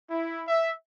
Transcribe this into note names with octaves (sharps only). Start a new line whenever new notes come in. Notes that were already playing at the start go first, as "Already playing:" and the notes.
E4
E5